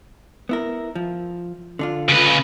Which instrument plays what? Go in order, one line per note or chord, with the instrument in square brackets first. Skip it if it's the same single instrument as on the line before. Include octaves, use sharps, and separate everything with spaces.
[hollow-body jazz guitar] B3 E4 A#4
F3
D3 D4 F4
[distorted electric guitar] C#3 B4